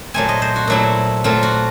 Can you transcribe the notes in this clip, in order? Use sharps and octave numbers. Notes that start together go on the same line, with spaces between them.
A#2 F#3 A3 C4 G#5
D#5
C5
F#4
A#2 F#3 A3 C4 E4
A#2 F#3 A3 C4 F4
F#4